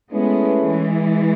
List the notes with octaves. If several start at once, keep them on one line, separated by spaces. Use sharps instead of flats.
G#3 A3 B3 C#4 E4 G#4 B4
E3 G#3